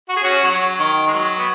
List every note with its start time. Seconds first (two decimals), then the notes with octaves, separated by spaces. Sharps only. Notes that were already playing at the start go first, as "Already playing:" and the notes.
0.09 F#4
0.16 G#4
0.23 C#4 F#4
0.43 F#3
0.79 D#3
1.07 G#3
1.13 F#3
1.39 B3